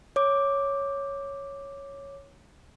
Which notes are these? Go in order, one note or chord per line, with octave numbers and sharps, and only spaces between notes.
C#5 D6